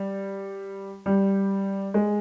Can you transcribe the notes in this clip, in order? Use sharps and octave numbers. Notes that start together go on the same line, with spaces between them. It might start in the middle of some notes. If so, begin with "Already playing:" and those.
Already playing: G3
G3
G#3